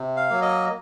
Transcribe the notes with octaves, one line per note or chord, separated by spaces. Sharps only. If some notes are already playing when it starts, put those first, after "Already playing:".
Already playing: C3
F5
F#3 A#3
D#5